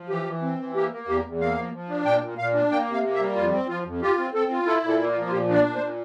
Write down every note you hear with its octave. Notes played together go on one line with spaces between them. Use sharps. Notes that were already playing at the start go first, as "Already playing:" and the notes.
Already playing: F3
E3 G4
E3
C4
E3
A#3 G4
A#3
E2 G4
E2
A#3 F5
F3
F3
D4
A#2 G5
A#2
A#2 F5
D4
A#3 G5
C3 F5
A#3
E5
G3
F2 F4
C4
F3 F4
F2
F4 G4
C4
C4 A4
F4
E4 A4
A#2
A4
A#3
F4
F3
F4
A#2 G4
D4
D5
A#2
C5
A#2